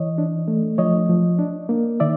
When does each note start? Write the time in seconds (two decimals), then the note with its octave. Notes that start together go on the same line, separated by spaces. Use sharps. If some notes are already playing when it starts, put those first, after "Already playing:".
Already playing: E3 C#5 D#5
0.18 D4
0.48 A3
0.78 F3 C#5 D#5
1.09 F3
1.39 D4
1.69 A#3
2.00 D#3 D5 E5